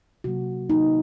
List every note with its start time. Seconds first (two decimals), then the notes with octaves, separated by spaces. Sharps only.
0.24 C3 F#3 A#3 F#4
0.70 C3 F#3 A#3 D#4